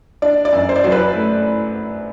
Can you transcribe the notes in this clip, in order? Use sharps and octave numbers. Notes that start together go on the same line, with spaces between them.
D4 D5
D5
F#2
C5
D5
F#3 C5
B4
A3